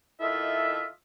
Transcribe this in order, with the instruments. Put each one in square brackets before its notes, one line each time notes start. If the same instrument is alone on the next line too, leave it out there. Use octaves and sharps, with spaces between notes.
[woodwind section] D#3 E4 F4 A4 D#5 E5